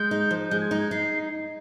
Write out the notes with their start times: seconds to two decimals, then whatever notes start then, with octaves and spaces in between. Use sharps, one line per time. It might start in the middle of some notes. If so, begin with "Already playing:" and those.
Already playing: G#3 G6
0.11 D#4
0.31 F3
0.50 G#3 G6
0.61 G#6
0.71 D#4 G6
0.81 G#6
0.91 D#4 C7